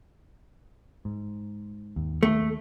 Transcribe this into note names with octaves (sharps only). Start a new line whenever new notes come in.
G#2
D#2
D#2 A3